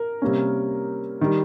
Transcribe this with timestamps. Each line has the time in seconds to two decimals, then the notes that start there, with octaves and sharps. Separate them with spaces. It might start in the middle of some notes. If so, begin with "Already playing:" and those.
Already playing: A#4
0.22 C3 G3 A#3 C#4
1.21 D#3 G3